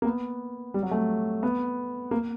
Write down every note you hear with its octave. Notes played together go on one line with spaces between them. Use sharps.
A#3
B3
G3
F#3
A3
B3
A#3